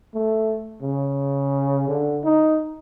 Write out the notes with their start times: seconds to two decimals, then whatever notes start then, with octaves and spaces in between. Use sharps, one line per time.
0.14 A3
0.82 C#3
1.88 D3
2.24 D#4